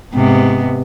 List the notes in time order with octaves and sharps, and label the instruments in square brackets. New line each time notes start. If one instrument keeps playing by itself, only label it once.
[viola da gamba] G#2 C3 B3